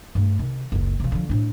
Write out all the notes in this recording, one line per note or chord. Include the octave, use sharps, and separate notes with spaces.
G2 A3
C3 D#3
F#1 C#2
C3 F3
D3 F3
A2 D4